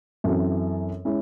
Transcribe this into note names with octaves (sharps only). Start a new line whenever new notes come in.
F#2 E3 C4 F#4 A4
G#3 C#4 E4